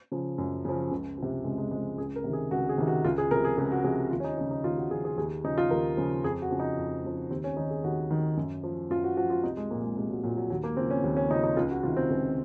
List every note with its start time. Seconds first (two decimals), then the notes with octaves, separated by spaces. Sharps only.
0.12 C#3 F3
0.38 F#2
0.65 C#3 F3
0.92 C#2
1.18 C3 F3
1.44 C#2 G#3
1.58 G#3
1.71 C3 F3 G#3
1.98 C#2 G#4
2.16 A#4
2.24 C3 D#3
2.33 G#4
2.51 C#2 F#4
2.69 G#4
2.78 C3 D#3
2.87 F#4
3.05 C#2 F4
3.18 G#4
3.31 C3 F3 A#4
3.45 G#4
3.58 C#2 G#4
3.71 F#4
3.84 C3 F3 G#4
4.11 D#2 F4
4.20 C#4
4.24 D#4
4.38 C#3 F3 D#4
4.51 D#4
4.64 D#2 F4
4.77 F#4
4.91 C#3 F3 G#4
5.05 G#4
5.18 D#2 G#4
5.44 C#3 F3 D#4
5.58 F4
5.71 D#2 A#4
5.97 C#3 F3
6.24 F2 G#4
6.42 F#4
6.51 C#3 F3
6.59 D#4
6.77 F2
7.04 C#3 F3
7.31 D#2 C4
7.44 C#4
7.57 D#3 D#4
7.71 G#4
7.84 D#2 F#4
8.10 D#3
8.37 F#2
8.64 F3
8.90 F#2 F4
9.04 F#4
9.17 F3 F#4
9.30 F4
9.44 C2 D#4
9.57 G#3
9.70 A#2 F3 A#3
9.83 G#3
9.97 C2 G#3
10.10 F#3
10.23 A#2 F3 F#3
10.37 F#3
10.50 D#2 F#3
10.63 A#3
10.77 C#3 F3 C4
10.90 C#4
11.04 D#2
11.17 C#4
11.30 C#3 D#4
11.34 F3
11.43 D#4
11.57 C#2 F4
11.70 F#4
11.83 C3 D#3 F4
11.97 C4
12.10 C#2